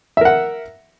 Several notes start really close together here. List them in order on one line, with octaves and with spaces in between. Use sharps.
E5 A#4 F#5